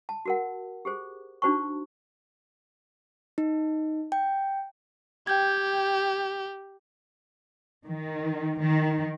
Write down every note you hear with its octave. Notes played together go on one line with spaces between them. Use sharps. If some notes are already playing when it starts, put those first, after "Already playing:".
A5
F#4 A#4 F#5
G4 G#4 C5
D4 D#4 F#4 C5 A5 C#6
D#4
G5
G4 G5 G6 G#6
D#3
D#3